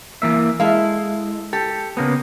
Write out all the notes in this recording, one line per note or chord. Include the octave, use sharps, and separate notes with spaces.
E3 A#3 E5
G#3 E4 A4 F5
G4 A4
C#3 A#3 B3